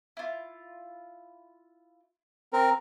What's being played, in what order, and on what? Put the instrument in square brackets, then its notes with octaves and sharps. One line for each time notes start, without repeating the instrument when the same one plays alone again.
[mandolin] E4 F4
[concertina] C4 A#4